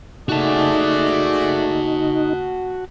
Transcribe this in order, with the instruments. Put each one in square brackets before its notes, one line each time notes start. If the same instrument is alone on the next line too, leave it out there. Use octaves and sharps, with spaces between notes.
[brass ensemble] A3 G#4 D5 [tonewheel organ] D#4 [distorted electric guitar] F#4 A5